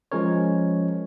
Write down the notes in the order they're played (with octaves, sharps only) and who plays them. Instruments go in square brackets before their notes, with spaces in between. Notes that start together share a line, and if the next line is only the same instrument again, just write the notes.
[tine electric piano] F3 G#3 C#4 A#4 C#5